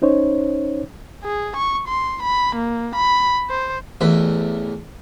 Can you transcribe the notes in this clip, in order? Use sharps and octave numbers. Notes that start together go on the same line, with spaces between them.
C#4 D#4 C5 C#5
G#4
C#6
C6
B5
A#3
B5
C5
A1 E2 B5